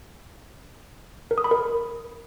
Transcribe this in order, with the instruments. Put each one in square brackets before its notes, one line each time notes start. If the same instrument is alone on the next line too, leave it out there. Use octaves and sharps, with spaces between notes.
[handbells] A#4
D#6
B5
A#4